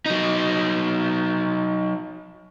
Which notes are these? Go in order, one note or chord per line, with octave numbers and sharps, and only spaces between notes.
F#3 D#4